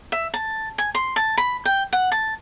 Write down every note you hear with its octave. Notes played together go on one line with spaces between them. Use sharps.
E5
A5
G#5
C6
A5
B5
G5
F#5
A5